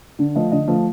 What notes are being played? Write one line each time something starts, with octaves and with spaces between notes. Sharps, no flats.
D3
F3 A3 D#5
D3 D#5
F3 A3